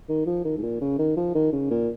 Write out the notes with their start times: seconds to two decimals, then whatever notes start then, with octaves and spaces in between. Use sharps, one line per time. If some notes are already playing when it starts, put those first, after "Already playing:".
0.09 D#3
0.26 F3
0.45 D#3
0.57 G#2
0.63 A#2
0.81 C#3
0.99 D#3
1.17 F3
1.35 D#3
1.53 C#3
1.71 A#2